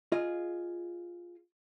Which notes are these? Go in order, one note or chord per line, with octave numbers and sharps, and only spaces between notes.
F4 G#4 D#5